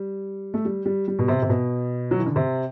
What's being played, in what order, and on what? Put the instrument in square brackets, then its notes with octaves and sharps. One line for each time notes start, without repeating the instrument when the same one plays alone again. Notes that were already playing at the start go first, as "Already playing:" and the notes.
Already playing: [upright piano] G3
A3
G3
G3
G3
B2
C3
C3
B2
F#3
E3
D3
C3